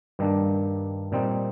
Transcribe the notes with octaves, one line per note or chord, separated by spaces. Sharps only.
G2 D#3 G3 A#3 D4
A#2 G3 C4 D#4